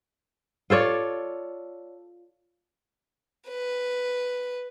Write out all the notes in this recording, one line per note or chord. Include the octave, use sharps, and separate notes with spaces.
F4 A4 C#5 D5
B4